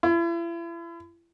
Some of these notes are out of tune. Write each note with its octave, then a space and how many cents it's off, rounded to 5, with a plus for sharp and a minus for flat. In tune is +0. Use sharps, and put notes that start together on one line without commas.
E4 +40